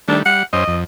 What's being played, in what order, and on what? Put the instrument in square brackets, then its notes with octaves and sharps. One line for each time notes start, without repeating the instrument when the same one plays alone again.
[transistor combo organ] D#3 G3 A3 [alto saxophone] D4
[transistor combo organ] G3 [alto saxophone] F#5
[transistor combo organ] F#2 C#4 C5 [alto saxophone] D#5
[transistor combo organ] F2